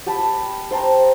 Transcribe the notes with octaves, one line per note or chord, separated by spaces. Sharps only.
G4 G5 A5 B5
C5 G5 A5 A#5